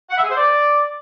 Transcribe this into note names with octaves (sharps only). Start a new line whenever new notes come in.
F#5
E5
G#4
C5
D5